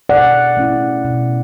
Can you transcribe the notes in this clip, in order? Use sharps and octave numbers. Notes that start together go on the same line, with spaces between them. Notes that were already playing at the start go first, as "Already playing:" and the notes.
B2 D5 F#5
A3 C#4 E4
B2